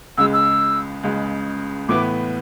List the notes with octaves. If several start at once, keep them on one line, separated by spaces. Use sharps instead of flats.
C#2 C#3 G#3 E6
E6
C#2 C#3 G#3
A2 E3 B3 E4 B4 D6